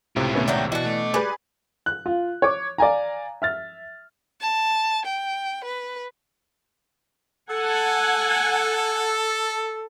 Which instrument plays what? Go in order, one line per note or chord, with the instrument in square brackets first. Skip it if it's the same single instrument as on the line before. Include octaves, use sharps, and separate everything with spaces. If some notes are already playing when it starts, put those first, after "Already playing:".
[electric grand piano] C#2 A2 C3 [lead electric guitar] E4 F4
[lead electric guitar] B2 D#3 [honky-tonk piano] A3 B3 C#4
[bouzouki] F#3 A3 G5 [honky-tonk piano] D5
[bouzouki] B2 D4 [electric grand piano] E3 [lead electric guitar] F#4
[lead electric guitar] A3
[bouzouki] G3 [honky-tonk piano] G#4 B4 [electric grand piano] D6
[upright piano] F#6
F4
C#5 D6
D5 F5 G#5 A#5
E5 F6 A6
[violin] A5
G5
B4
[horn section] A4 [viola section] F#5 G#5